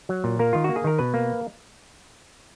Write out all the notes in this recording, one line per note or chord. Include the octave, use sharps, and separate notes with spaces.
F#3
A#2
A#3 A#4
D#3 F4
A#3 F#4
G#4
D#3 A#4
B2 B4
A#3